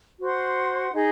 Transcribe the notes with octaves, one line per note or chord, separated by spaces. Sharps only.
F#4 C5 F#5 C6
D#4 G#4 D#5